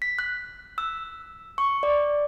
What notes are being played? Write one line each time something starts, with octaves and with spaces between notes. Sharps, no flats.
B6
F#6
E6
C#6
D5